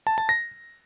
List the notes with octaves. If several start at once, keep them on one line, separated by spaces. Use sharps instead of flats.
A5
A5
A#6